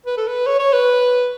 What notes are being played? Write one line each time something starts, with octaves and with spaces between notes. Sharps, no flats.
B4
A4
B4
C#5
C#5
B4